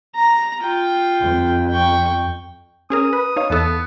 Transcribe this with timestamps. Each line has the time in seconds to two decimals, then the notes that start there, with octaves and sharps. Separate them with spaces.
0.16 A#5
0.61 F4 G5
1.21 F2
1.71 G5 C#6
2.90 C#4 G#4 A#4 D#6
3.13 B4
3.36 D#4 C#5 F5
3.50 E2 E3 B3 A4